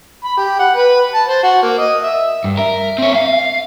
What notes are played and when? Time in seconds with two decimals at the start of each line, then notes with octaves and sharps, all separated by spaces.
0.24 B5
0.37 G4
0.59 F#5
0.76 B4
1.14 A5
1.28 C5
1.43 F#4
1.62 A#3
1.79 D#5
2.02 E5
2.44 G2
2.57 A#4 E5
2.98 C4 C#5
3.15 F5